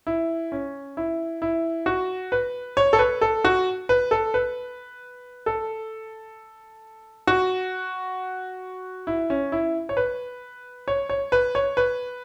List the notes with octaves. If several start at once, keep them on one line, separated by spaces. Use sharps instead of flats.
E4
C#4
E4
E4
F#4
B4
C#5
A4
B4
A4
F#4
B4
A4
B4
A4
F#4
E4
C#4
E4
C#5
B4
C#5
C#5
B4
C#5
B4